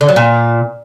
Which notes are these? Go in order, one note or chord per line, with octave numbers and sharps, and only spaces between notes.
D3
F#3
A#2